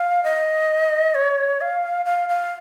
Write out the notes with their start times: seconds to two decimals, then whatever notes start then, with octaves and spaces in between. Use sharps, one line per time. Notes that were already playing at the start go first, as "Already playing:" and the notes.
Already playing: F5
0.24 D#5
1.15 C#5
1.61 F5
2.05 F5
2.29 F5